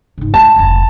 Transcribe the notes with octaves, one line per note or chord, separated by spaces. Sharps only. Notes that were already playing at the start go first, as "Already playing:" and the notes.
G#2 C#3
G#3 A5
F1 C#2